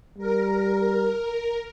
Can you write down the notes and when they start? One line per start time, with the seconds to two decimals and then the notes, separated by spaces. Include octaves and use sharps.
0.18 G3 A#4